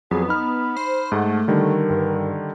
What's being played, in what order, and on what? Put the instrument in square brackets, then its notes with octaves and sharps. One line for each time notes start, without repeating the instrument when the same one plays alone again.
[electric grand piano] F2 F#3 [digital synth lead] B3 [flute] G#4
[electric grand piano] D#4 F6 [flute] B5
[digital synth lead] C5
[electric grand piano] G#2 G#4 F#5 [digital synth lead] A3
[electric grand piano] D3 D#3 G3 [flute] A#4
[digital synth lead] G2